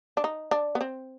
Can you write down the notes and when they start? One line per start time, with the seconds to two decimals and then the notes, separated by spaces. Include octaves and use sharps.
0.17 D4
0.24 D#4
0.51 D4
0.75 B3
0.81 C4